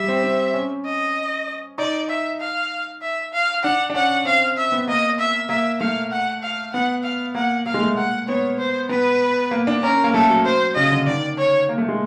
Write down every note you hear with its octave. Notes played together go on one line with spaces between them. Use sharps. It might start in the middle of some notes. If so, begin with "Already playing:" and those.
Already playing: G3 E5
C4
C4
C#4
D#5
D#4 D5
E5
F5
E5
F5
D4 F#5
D4
C#4 F#5
C4 F5
E5
B3
A#3 D#5
E5
A#3 E5
A3 F5
F#5
F5
B3 F#5
F5
A#3 F#5
A#3 F5
G#3
A3
A#3 F#5
B3 C#5
C5
B3 B4
A#3
D4
C#4 A#4
A#3
A3 A4
F#3
C5
C#3 D#5
D3
D#3 D5
C#5
A#3
A3
G#3